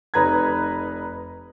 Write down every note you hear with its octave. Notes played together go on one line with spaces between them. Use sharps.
F1 D#4 B4 A#5 B5 G#6